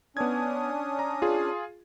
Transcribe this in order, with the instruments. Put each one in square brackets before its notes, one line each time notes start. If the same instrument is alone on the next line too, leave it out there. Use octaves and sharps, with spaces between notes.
[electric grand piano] B3 G#6 [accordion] C#4 D4 D#6
[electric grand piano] A#5
F4 G#4